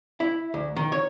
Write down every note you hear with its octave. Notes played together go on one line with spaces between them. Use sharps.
E4
D2
D#3
C#5